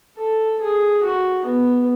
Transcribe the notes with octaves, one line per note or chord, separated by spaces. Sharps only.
A4
G#4
F#4
B3